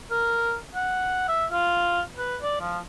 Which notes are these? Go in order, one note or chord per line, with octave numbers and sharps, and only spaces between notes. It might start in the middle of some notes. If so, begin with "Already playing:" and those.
A#4
F#5
E5
F4
B4
D5
F3